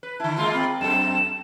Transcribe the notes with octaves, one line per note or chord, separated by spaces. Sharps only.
B4
D3 E4 A5
G#3 A#3 F4 C6
C4 B5
F#2 A4 E7